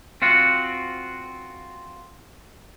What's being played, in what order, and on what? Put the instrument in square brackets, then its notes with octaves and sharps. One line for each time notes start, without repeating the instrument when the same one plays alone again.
[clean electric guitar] C4 F4 F#4